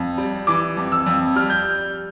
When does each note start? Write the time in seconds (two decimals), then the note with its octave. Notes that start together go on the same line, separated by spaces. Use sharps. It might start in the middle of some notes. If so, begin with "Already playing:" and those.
Already playing: F2
0.18 G3
0.47 E3 D6
0.77 F2
0.92 E6
1.06 F2
1.36 G3 F6
1.50 G6